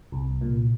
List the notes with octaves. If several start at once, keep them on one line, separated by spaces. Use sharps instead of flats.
C2
A#2